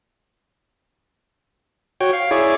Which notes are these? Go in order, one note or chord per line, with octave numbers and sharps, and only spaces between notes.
F#4 C#5 G5
F5
E4 G#4 C#5 D5